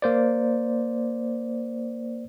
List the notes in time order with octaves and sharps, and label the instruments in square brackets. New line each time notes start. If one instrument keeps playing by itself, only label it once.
[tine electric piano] A#3 C5 D5